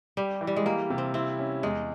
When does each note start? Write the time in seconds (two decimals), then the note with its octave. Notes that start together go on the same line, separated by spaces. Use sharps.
0.17 G3 G4
0.41 E3
0.47 G3
0.56 G#3
0.65 G3 A#3
0.90 C3
0.98 C4
1.14 C4 E4
1.39 C#4
1.63 E2 G#3